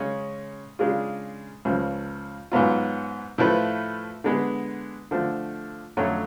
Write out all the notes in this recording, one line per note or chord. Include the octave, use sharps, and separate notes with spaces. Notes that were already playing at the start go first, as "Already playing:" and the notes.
Already playing: C#3 G#3 C#4
C#3 G#3 D4 F4 G#4
C#2 C#3 F3
G#2 F#3 B3 F4
A2 F3 A3 F4 B4
D3 G#3 B3
D3 F3 A3
F2 D3 F#3 A3 C#4